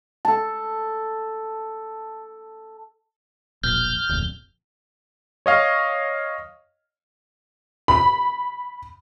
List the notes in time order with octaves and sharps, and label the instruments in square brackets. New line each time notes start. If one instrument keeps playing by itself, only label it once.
[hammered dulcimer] A4 A5
[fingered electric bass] E1 A#1 [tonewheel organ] F6 G6
[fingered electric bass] D1 A#1 F2
[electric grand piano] C#5 D#5 F5
[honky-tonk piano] B5